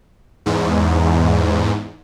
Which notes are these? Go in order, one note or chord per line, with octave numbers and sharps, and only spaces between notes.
E2 G#2